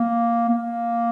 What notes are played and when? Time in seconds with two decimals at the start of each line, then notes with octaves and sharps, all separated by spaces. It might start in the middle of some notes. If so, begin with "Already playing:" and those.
Already playing: A#3
0.49 A#3